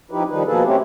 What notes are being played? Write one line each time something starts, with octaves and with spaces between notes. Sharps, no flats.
F3 D#4 E4 G4 B4
D#3 F3 G3 D#4 B4
B2 F3 A#3 G#4 A4 B4
A3 C4 C#4 E4 G4